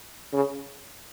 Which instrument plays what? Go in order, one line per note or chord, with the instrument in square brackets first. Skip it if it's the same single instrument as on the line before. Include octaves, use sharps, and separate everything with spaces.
[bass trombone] C#3